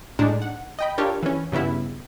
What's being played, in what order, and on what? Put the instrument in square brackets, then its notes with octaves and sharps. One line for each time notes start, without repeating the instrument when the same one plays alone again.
[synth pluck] A2 G#3 D4 D#4
F#5
D#5 G5 B5
D4 F4 G4 A4 A#4 C#5
E3 C#4
G2 C#3 B3 E4